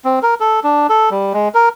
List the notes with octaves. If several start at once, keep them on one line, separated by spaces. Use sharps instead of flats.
C4
A#4
A4
D4
A4
G3
G#3
A#4